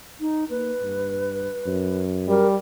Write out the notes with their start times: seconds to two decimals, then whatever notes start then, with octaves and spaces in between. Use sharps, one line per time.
0.20 D#4
0.50 A#3 B4
0.82 G2
1.66 F#2
2.28 G3 A#4